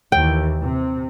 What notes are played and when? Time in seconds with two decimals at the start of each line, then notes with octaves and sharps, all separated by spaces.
0.12 D#2 E3 G5
0.62 C3